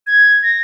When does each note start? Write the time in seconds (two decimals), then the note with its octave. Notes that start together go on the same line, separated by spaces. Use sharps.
0.07 G#6
0.43 A#6